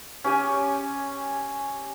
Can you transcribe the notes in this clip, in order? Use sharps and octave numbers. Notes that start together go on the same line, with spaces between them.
C#4 G4 G#5